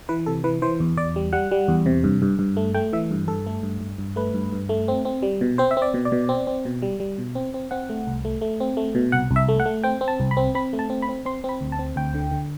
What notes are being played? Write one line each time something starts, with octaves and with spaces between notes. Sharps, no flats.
E3 B4
C3 A4
E3 B4
E3 C5
E2
E2 D5
G3
G3 F#5
G3
E2
C3
G2
G2
G2
A3
A3 G5
E3 E5
G2
G2 A4
A3
G2
G2
G2
A3 B4
G2
G2
A3
C4
C4
G3
B2
C4 C5
E5
C4
D5
B2
D5
B2
C4
C4
B2
G3
G3
B2
C4
C4
C4 F#5
A3
C2
A3
A3
C4
A3
B2
C2 F#5
C2
E5
A3
F#5
A3
C4 G5
C4
A5
C2
B5
C4
C4 B5
A3
A5
C4
B5
C4
C4 C6
C4 B5
D2
A5
C4
D2 G5
D3
D3